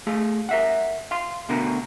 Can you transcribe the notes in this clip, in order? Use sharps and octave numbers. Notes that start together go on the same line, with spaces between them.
A3 G#4 F5
A#4 E5 F#5
F5 C6
D2 B2 D3 A#4 A#5